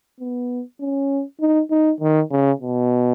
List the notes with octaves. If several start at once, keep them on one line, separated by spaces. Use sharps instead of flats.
B3
C#4
D#4
D#4
D#3
C#3
B2